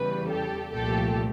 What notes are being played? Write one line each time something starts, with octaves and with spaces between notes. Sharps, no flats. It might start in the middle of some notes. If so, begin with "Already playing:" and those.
Already playing: E2 C#3 E3 G3 B4
G4 A4
C2 A#2 F3 A3 G4 A4